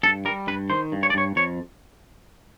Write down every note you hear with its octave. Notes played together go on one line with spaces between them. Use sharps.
G2 A4
G3 A#4
G2 B4
D#3 C5
G2
C#5
D5
G2 C#5
F2 C#5